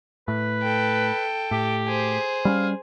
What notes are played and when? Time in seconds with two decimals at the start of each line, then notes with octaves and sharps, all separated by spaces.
0.28 A2 B4
0.62 A4 G5
1.51 A2 G4
1.87 G#4 C5
2.45 G3 C4 C#4 F5